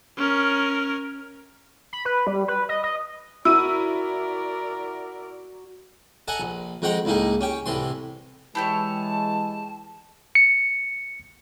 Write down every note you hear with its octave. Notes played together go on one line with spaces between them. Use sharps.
C#4 A#4
B5
B4
G3
B4
D#5
D#5
E4 F#4 A#4 D5 E6 D#7
A4 D#5 F#5 G#5 A#5
A#1
F2 G#3 F#5 G5 A#5 C6
C#2 A2 A#3 D#4 G#4
C#4 G4 G5
C2 A2 E3 C6
E3 G#3 E4 G4 C#5 A5
C#7